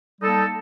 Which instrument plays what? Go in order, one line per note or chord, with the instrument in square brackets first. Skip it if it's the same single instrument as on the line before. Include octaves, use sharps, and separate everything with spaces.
[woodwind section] G3 A#3 D#4 A4